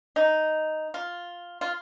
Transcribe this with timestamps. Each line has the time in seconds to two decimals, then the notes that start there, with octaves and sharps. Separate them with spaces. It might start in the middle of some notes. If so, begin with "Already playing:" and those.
0.16 D#4
0.94 F4
1.61 F4